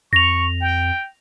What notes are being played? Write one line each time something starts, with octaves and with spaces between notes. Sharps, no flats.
F2 C#6 A#6 F7
G5